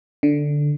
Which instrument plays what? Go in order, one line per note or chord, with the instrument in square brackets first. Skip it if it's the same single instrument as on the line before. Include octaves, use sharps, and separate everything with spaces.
[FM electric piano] D3